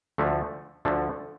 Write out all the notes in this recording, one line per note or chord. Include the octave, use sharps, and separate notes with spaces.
D2 D3 F3 A3
D2 D3 F3 A3